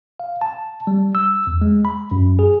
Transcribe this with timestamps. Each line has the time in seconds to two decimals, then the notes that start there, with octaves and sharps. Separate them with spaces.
0.20 F5
0.41 A5
0.87 G3
1.15 E6
1.47 E2
1.62 G#3
1.85 B5
2.11 F#2
2.39 G#4